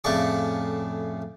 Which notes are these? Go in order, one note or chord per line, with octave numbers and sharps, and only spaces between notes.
F2 A2 C#3 D5 C#6